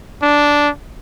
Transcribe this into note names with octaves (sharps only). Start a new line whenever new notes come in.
D4